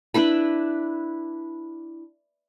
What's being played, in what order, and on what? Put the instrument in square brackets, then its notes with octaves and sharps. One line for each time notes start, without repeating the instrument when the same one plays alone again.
[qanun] D4 E4 B4 B5